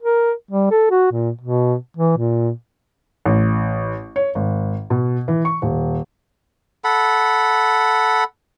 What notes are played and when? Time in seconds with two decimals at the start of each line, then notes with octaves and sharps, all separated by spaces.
0.02 A#4
0.51 G3
0.71 A4
0.91 F#4
1.12 A#2
1.42 B2
1.97 E3
2.17 A#2
3.26 A1
4.16 C#5
4.35 G#1
4.90 B2
5.28 E3
5.45 C#6
5.62 D#1
6.84 A4 F#5 B5